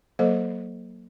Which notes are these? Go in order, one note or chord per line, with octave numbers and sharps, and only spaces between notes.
F#3 A#3 A4 C5 D#5